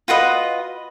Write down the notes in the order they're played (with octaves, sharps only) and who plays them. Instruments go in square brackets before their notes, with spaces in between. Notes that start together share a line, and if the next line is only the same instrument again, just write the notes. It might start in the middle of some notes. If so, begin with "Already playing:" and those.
[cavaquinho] F4 F#4 B4 D#5